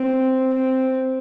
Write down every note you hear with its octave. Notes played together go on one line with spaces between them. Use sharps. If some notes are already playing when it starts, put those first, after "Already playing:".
Already playing: C4
C4